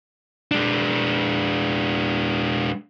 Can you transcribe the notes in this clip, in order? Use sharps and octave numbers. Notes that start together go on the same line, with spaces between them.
G#3 D4